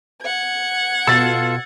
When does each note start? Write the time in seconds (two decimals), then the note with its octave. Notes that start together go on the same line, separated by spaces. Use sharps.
0.22 F#5 G#6
1.07 B2 F4 A4 E6 A6